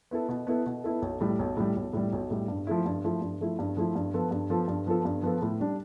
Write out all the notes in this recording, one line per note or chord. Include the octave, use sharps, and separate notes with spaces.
B3 E4 A4
B2
B3 E4 A4
B2
B3 E4 A4
B1
A2 G3
B1
A2 G3
B1
A2 G3
B1
A2 G3
G2
F3 A3 E4
G2
F3 A3 E4
G2
F3 A3 E4
G2
F3 A3 E4
G2
F3 B3 F4 A4
G2
F3 B3 F4 A4
G2
F3 B3 F4 A4
G2
F3 B3 F4 A4
A2
G3 D4